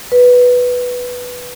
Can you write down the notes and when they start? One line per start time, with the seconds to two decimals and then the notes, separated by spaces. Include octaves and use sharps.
0.12 B4